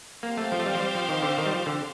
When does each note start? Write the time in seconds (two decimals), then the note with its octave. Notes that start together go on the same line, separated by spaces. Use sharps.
0.23 A#3 C4 G4 C5 F5
0.37 A3
0.52 F3
0.60 A3
0.66 G3
0.75 F3
0.80 G3
0.95 F3
1.09 D#3
1.22 D3
1.38 D#3
1.46 G3
1.52 F3
1.66 D3